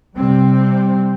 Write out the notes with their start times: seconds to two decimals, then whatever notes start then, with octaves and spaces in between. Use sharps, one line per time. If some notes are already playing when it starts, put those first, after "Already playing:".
0.15 C3 G3 C4